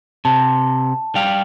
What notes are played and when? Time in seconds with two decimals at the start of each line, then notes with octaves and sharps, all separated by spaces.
0.25 C3 A5
1.15 G3 G4 F5